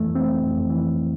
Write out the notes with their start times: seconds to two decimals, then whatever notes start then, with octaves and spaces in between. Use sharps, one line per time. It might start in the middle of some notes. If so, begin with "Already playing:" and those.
Already playing: F2 E3 A3
0.15 C4
0.43 F2
0.70 E3